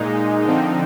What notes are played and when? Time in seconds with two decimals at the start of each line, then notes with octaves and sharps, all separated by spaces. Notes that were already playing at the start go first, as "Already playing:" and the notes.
Already playing: A#2 G#3 D#4
0.44 D3 F3 C4 D#4